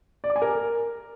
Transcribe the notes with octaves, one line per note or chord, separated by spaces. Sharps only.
D5
D6
G#5
A#4